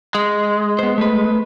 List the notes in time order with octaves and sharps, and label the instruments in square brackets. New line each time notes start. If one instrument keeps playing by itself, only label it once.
[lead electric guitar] G#3
[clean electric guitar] B3 C5
A3 B4